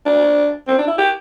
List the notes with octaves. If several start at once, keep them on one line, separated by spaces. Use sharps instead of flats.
D4
C4
D4
E4
G4